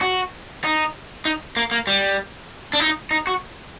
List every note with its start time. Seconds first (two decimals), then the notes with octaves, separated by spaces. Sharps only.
0.01 F#4
0.64 D#4
1.25 D#4
1.57 A#3
1.71 A#3
1.87 G3
2.73 D4
2.80 D#4
3.11 D#4
3.27 F#4